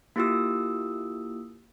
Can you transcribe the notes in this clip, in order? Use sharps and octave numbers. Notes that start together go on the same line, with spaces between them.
A#3 E4 F4 G4 D#6 E6